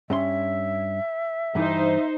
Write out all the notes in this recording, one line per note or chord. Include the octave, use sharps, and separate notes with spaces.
G2 C#4 E5 C6
G2 E3 D#4 C5